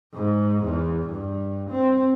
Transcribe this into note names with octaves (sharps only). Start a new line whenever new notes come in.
G#2
E2
G2
C4